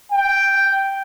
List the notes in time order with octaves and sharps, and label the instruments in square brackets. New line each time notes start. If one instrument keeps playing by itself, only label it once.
[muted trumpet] G5